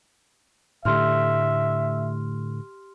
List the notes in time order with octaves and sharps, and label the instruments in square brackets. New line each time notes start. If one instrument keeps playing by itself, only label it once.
[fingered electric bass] A2 D3 A3 [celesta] G4 C6 F6 [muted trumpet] E5